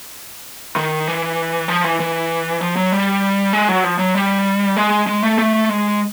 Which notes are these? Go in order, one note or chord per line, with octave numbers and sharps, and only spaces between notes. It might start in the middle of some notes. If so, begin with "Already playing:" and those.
D#3
E3
F3
E3
E3
F3
F#3
G3
G#3
F#3
F3
F#3
G3
G#3
G#3
A3
A3
G#3